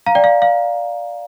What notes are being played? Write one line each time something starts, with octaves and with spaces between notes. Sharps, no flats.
F5 A#5
D5 G5
F5
F5